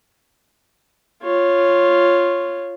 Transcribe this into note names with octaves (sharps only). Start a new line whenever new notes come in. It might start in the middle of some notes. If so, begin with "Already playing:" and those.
F4 C#5